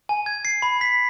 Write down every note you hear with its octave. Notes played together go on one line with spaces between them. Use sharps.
G#5
G#6
C7
B5
B6